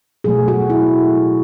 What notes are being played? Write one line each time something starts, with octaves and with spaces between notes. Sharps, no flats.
B2 F#3 A3 G#4
F#4
E4